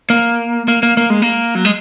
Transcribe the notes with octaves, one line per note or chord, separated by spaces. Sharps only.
A#3
A#3
A#3
A#3
G#3
A#3
F#3
G#3